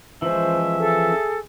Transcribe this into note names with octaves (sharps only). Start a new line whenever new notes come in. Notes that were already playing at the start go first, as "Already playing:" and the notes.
E3 F3 G#3 C#4 C5 E5
G#4 A4